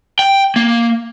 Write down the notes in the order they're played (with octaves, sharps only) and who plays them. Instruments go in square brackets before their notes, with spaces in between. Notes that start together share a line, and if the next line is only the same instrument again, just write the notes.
[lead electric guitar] G5
A#3